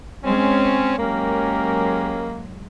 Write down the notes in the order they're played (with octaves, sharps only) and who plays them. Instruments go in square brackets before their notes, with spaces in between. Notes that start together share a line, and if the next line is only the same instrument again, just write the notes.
[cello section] G#3 [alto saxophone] C4 [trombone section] C#4
[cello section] F#3 G#3 [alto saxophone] A#3 [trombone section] C#4 G4 A#4